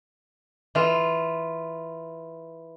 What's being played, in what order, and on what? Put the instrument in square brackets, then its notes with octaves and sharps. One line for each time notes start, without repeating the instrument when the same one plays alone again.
[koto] E3 F4